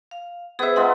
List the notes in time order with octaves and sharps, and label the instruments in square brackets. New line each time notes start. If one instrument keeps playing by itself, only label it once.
[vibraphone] F5
[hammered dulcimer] B3 E5 [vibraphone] G#4 C5
[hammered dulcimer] G#3 B3 F4 [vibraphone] F#5 A#5